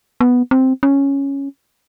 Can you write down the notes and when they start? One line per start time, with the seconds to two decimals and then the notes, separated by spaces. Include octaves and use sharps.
0.21 B3
0.51 C4
0.83 C#4